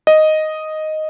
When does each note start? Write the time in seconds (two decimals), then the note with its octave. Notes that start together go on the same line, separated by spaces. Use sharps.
0.07 D#5